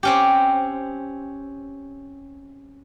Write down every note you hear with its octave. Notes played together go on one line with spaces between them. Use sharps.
C4 C#4 G4